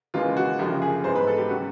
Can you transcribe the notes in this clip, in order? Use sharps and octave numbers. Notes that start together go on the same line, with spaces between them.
D#2 C#3 E3 G#3 F4
F#4
F#1 F#2 D3 F3 G4
G#4
G#2 E3 G#3 B3 C5
B4
A4
G4
C#3 F#3 F#4